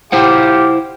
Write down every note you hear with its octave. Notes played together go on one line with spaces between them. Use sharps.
E4 F4 G4 C5 F#5